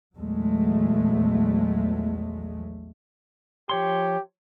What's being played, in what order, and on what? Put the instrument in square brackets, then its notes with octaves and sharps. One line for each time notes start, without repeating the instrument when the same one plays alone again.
[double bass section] A#1 E2 F#3 G#3 A3
[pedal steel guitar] F3 C#5 C6 [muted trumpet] G4